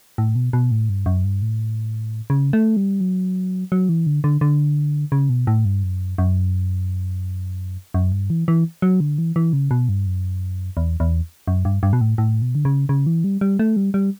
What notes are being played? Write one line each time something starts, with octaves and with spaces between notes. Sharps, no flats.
A2
B2
B2
A2
G2
F#2
G2
A2
C#3
A3
G3
F#3
F#3
E3
D3
D3
D3
C#3
B2
A2
G2
F#2
F#2
F#2
G2
E3
E3
F#3
D3
E3
E3
C#3
B2
G2
F#2
E2
E2
F#2
G2
G2
B2
A2
A2
B2
D3
C#3
C#3
E3
G3
G3
A3
G3
G3